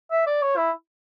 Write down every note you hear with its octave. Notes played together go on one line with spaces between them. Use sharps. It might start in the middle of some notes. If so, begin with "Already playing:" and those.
E5
D5
C#5
E4